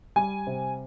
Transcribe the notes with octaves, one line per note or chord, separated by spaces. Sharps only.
G3 G#5
C3